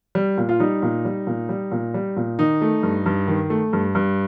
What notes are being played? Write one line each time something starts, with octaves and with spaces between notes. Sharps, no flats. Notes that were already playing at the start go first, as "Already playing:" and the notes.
G3
A#2
F4
G3 D#4
A#2
G3
A#2
G3
A#2
G3
A#2
D#3 D#4
A3
G2
G2
D#3
A3
G2
G2